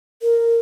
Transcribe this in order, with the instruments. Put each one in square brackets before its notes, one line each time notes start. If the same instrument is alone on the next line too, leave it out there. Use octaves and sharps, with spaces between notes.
[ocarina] A#4